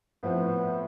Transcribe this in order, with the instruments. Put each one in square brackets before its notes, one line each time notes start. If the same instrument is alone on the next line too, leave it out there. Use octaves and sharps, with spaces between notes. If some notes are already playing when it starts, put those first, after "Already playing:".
[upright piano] A2 F3 C4 [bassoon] B3